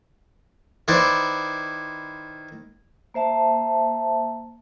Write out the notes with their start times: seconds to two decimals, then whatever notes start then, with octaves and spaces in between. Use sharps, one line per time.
0.88 D#3 E4 B4 C5 D5
3.14 A#3 C5 E5 A5